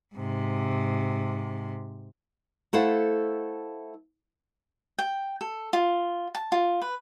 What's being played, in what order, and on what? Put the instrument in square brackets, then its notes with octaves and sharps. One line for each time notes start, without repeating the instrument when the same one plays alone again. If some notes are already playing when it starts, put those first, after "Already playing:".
[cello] G#2 C3
[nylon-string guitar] A3 E4 A4 C5 F5 F#5
[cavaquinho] G5
A4
F4
A5
F4
B4